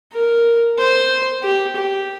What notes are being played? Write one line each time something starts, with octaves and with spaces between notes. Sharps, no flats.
A#4
C5
G4
G4